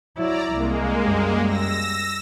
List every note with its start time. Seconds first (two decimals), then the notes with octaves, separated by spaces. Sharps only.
0.16 F#3 E4 D5 A#5
0.53 C2 G#3 A#3
1.03 F#2 G3
1.45 E6 A#6